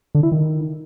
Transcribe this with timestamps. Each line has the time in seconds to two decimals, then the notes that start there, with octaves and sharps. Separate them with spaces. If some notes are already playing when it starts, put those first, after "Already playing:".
0.15 D3
0.23 E4
0.32 D#3